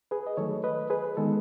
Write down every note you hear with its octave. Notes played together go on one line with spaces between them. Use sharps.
G#4 B4
D#5
D#3 F#3 A3 A4 C#5
B4 D#5
G#4 B4
D#3 G#3 B3 A4